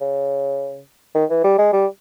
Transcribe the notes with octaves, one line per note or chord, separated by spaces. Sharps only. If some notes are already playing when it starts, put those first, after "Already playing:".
C#3
D#3
E3
G3
G#3
G3